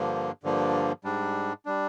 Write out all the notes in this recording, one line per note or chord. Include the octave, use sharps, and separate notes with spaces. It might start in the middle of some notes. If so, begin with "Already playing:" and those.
Already playing: G2 D3 F3 A#3
G2 D3 F3 A#3
G#2 G3 D4
G3 D4